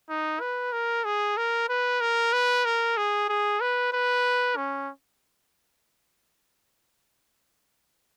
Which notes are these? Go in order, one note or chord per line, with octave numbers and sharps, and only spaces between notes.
D#4
B4
A#4
G#4
A#4
B4
A#4
B4
A#4
G#4
G#4
B4
B4
C#4